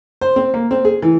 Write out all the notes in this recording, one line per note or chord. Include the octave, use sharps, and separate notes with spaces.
C5
C4
A#3
C4
G#4
E3